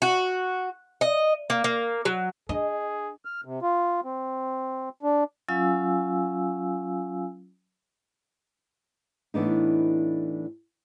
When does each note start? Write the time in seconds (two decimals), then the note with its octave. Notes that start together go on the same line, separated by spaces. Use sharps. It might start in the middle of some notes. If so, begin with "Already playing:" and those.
0.02 F#4
1.01 D#5
1.50 A#3
1.64 A#3
2.05 F#3
2.49 D4 G#4 D#5
3.25 F6
3.45 C3
3.62 F4
4.04 C4
5.03 D4
5.48 F#3 C#4 F4 F5 G#5 E6
9.34 A2 E3 B3 D4 D#4